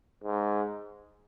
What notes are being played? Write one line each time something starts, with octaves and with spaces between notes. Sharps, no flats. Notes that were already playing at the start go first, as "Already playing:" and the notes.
G#2